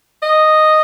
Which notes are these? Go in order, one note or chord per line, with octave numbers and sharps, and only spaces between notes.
D#5